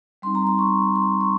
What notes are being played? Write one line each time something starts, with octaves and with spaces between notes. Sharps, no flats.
G3 C4 D#4 C6
A#5
C6
C#6
C6
C#6